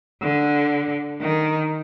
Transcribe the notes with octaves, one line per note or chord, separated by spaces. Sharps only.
D3
D#3